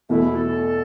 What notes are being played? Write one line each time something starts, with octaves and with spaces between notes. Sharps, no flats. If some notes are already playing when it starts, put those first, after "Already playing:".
E2 B2 A3 E4
A4